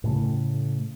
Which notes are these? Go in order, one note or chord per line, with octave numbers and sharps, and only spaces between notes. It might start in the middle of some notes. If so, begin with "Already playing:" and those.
A2 C#3 A3